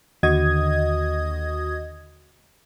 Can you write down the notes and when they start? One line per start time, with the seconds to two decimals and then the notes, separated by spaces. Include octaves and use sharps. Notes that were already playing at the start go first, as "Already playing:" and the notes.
0.23 D#2 D3 F#4 D#5 D#6 G#6